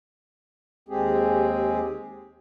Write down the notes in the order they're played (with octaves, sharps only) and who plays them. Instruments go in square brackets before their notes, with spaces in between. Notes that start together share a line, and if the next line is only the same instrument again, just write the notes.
[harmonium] D#2 G#3 C4 G4 G#4